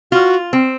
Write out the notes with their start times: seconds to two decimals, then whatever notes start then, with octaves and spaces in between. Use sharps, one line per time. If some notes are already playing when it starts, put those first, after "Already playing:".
0.11 F4 F#4
0.53 C4